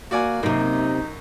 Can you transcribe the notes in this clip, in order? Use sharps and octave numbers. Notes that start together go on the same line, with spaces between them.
A#3 F#4 D5 G#5
F#2 C3 A#3 D#4